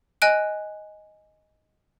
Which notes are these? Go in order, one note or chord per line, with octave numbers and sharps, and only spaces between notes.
D#5 G#5 F#6 D7